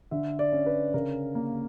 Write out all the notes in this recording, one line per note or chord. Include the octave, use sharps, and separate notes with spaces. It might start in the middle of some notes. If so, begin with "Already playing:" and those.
D3 E5
D5
C#4
B4
C#3 A#4
A#3